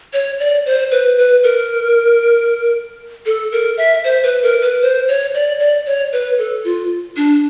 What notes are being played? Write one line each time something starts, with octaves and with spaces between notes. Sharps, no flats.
C#5
D5
C5
B4
B4
A#4
A4
A#4
E5
C5
B4
A#4
B4
C5
C#5
D5
D5
C#5
B4
A4
F4
D4